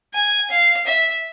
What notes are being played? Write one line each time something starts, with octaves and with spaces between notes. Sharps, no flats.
G#5
F5
E5